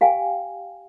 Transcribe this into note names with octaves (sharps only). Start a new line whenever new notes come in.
G4 F5 G5 G#5